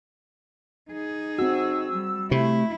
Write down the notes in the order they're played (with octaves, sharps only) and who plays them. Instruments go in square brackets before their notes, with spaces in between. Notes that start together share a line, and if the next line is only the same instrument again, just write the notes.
[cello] D#4 G#4
[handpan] C4 F#4 [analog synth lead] E6
[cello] G3
[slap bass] C3 [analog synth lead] A3 [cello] E4